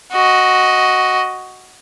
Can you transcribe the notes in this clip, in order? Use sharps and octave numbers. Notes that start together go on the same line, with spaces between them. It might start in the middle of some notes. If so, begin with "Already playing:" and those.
F#4 D#5